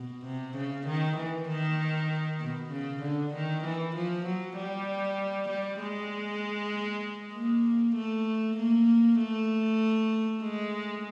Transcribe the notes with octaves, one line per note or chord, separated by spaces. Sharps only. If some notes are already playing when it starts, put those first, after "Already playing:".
Already playing: B2
C3
C#3
D#3
E3
D#3
B2
C#3
D3
D#3
E3
F3
F#3
G3
G3
G#3
A#3
A3
A#3
A3
G#3